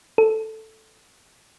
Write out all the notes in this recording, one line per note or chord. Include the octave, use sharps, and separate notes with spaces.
A4